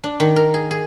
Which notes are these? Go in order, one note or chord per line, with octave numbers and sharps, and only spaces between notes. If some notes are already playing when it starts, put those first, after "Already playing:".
D4
D#3
A#4
G#4
G#4